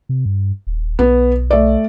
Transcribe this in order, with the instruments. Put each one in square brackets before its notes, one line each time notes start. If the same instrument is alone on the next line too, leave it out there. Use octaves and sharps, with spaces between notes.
[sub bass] C3
G2
D#1
[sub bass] B1 [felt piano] B3
[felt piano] A3 D5